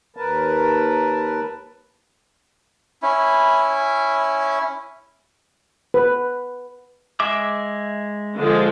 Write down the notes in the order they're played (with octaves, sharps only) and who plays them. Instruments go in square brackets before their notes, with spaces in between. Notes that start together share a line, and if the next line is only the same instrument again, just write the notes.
[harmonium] D#2 A#4 B4 A5
[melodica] C#4 E4
[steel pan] B4
[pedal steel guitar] G#3 E5 D6
[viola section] D3 F3 G#3